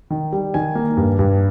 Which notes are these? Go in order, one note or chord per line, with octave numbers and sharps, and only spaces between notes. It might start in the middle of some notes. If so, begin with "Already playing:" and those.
D#3
G3
D#3 G#5
A#3
G2
G2